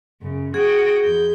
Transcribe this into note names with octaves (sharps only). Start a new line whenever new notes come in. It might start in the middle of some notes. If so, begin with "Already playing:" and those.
F#2 C#3
F#4 G#4 G5 D#6
F2 G6